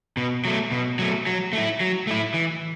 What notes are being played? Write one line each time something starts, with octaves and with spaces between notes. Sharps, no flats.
B2
F#3 A3
B2
F#3 A3
F#3
A3 E4
F#3
A3 E4
E3